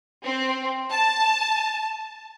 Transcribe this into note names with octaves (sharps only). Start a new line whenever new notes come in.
C4
A5